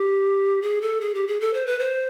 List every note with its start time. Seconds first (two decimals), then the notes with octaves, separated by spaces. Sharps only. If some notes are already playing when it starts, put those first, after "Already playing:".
Already playing: G4
0.62 G#4
0.82 A4
1.01 G#4
1.15 G4
1.27 G#4
1.41 A4
1.54 C5
1.66 B4
1.79 C5